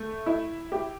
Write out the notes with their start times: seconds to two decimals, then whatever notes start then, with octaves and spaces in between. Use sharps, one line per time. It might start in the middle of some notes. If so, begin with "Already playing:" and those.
Already playing: A3
0.26 E4
0.72 G4